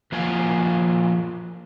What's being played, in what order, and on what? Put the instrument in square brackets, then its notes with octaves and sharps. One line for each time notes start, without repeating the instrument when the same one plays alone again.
[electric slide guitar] F3 A#3 F#4 F5 G#5